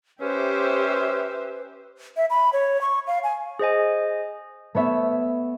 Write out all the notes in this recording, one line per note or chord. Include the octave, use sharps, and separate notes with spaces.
C#4 G4 B4 C5 E5
E5
B5
C#5
C#6
F5
G#5
G#4 C5 D#5 G#5
A3 B3 C#5 E5